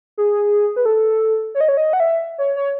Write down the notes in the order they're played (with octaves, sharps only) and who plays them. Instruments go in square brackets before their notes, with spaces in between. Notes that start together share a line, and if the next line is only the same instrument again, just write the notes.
[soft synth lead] G#4
B4
A4
C#5
D#5
C#5
D#5
F#5
E5
C#5
C#5